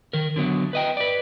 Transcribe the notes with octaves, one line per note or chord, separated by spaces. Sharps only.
D#3 A#4
D3 F#3 B3
B4 D#5 G5
B4 D5